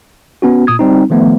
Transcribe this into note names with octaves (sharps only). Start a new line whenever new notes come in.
B3 C#4 F#4
A#2 D#6 G#6
G3 C4 D#4
D#3 F3 A3 B3